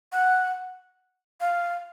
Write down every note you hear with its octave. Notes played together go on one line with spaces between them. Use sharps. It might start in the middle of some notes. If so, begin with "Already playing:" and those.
F#5
F5